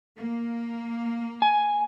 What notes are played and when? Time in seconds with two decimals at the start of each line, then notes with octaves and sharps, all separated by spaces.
0.16 A#3
1.42 G#5